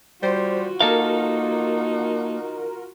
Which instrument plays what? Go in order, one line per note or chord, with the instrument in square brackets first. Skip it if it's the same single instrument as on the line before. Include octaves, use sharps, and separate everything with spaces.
[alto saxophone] G3 [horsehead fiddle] F4 F#4 [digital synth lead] C5
[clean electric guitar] A#3 A4 F5 [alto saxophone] D#4 [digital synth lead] A#4